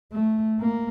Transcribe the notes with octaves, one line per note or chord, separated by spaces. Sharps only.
A3
A#3